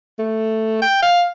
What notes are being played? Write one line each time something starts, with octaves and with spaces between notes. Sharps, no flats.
A3
G5
F5